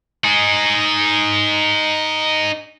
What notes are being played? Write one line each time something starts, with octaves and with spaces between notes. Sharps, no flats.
D#4 G#4